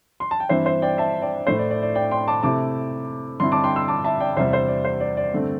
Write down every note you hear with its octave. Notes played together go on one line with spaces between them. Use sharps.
C6
A5
G5
G2 E3 C4 C5 E5
C5 E5
D5 G5
E5 A5
D5 G5
A2 A3 E4 C5 E5
D5
D5
D5
D5 G5
G5 C6
A5 D6
C3 A3 C4 E4 A5 D6
G2 D3 C4 E4 C6
A5 D6
G5 C6
C6 E6
A5 D6
E5 A5
D5 G5
E2 C3 G3 C5 E5
C5
D5
C5
D5
D5
G2 D3 A3 C4